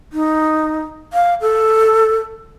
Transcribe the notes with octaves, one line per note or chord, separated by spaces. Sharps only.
D#4
F5
A4